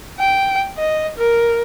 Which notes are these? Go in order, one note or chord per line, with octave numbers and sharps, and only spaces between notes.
G5
D#5
A#4